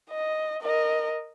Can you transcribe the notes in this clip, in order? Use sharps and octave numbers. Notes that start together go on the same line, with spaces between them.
D#5
A#4 D#5